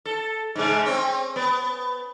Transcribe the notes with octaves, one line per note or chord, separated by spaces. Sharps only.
A4
G#2 C#3 G#3
C4 C#4
B3